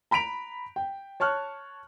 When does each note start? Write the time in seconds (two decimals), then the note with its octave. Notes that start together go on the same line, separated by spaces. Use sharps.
0.11 A#5 B5 B6 D7 F7
0.76 G5
1.20 C#5 A5 C#6 F6 F#6